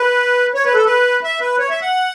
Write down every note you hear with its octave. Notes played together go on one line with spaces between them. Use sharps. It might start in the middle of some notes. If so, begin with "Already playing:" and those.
Already playing: B4
C#5
B4
A4
B4
E5
B4
C#5
E5
F#5